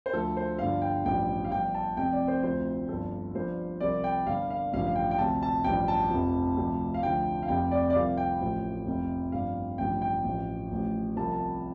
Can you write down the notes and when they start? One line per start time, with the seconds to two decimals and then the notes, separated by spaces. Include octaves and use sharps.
0.06 C5
0.13 D2 D3 F3 A4
0.37 C5
0.59 G1 G2 D3 F3 F5
0.82 G5
1.05 A1 G2 F3 G5
1.45 F5
1.51 G1 G2 F3 G5
1.74 A5
1.97 F1 F2 C3 G5
2.12 D5
2.28 C5
2.43 D2 C3 F3 C5
2.89 G1 G2 F3 A4
3.35 G1 G2 F3 C5
3.80 C2 C3 F3 D5
4.04 G5
4.26 G1 G2 D3 F5
4.50 F5
4.73 A1 G2 D3 F3 F5
4.87 F5
4.96 G5
5.11 G5
5.18 D2 C3 F3 A5
5.42 A5
5.64 A1 G2 F3 G5
5.88 A5
6.10 F1 F2 F3
6.56 D2 C3 F3
6.94 F5
7.03 D2 D3 F3 G5
7.43 F5
7.48 F1 F2 C3 G5
7.71 D5
7.90 D5
7.95 C2 C3 F3 F5
8.17 G5
8.41 A1 A2 F3
8.86 F1 F2 F3
9.32 G1 G2 F3 F5
9.78 A1 G2 D3 F3 G5
10.02 G5
10.24 A1 A2 F3
10.71 A1 A2 F3
11.16 C2 C3 F3 A5
11.32 A5